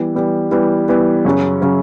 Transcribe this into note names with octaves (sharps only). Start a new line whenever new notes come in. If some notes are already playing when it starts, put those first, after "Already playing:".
Already playing: E3 G3 B3
E3 G3 B3
E3 G3 B3
E3 G3 B3
F#2 C#3 F#3 C#4
C#3 F#3 C#4